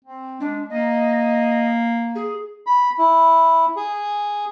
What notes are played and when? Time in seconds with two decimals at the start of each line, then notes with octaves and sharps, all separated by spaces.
0.05 C4
0.40 G#3 D4
0.69 A#3 D#5
2.15 G#4
2.67 B5
2.99 E4
3.76 G#4